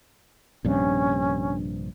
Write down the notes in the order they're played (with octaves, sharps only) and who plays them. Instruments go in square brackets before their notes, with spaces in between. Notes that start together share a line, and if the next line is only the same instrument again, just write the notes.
[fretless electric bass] A#1 G2 C3 [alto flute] C#4